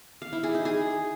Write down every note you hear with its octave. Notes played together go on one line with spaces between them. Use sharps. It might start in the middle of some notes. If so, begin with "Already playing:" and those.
F5
E4
G#4
D#4
G#4